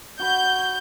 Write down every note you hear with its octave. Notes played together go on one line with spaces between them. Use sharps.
F#4 B5 G6